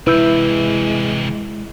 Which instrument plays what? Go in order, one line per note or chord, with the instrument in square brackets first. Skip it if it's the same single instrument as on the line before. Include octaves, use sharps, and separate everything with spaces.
[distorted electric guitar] C3 E3 [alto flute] G#3 [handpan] E4 [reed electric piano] B4 E6 G6